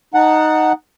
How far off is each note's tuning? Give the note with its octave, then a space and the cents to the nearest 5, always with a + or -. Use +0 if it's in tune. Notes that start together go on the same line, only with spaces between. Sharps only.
D#4 +0 F#5 +0 A5 +30